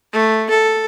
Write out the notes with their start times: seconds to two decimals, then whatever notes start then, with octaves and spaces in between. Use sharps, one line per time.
0.13 A3
0.50 A4